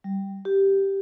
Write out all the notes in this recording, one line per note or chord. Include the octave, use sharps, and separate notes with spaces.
G3
G4